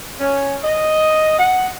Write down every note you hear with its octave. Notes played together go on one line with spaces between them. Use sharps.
C#4
D#5
F#5